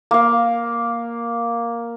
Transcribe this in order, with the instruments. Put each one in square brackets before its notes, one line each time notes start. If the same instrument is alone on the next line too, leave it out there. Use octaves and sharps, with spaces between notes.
[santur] A#3 F5